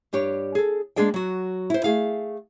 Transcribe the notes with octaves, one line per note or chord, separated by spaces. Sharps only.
G2 D4 G4 C#5
G#4 A4
G#3 A#3 D4 G#4 D5 G5
F#3 F#4
E4 C5
A3 G#4 F5